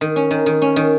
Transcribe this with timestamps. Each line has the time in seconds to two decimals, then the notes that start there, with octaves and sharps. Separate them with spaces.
0.01 D#3
0.16 C#4
0.31 D#3
0.46 D#3
0.62 C#4
0.76 D#3